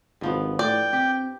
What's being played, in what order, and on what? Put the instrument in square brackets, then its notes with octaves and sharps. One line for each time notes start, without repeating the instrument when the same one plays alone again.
[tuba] G#1 [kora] G2 F3 B3
[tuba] A2 [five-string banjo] D5 [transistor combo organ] G5
[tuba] C4 [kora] G4